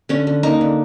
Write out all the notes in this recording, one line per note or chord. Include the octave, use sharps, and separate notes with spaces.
D3 C#4
D3
A#3 D#4
D3